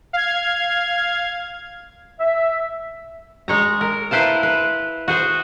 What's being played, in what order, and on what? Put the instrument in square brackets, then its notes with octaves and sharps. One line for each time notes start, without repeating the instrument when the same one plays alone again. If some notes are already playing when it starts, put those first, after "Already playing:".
[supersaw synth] F5 G#6
[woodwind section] E5
[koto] G#3 C#5 A#5
A#4
A#3 E4 B4 C5 F5 A5
B4
F#4 G#4 C5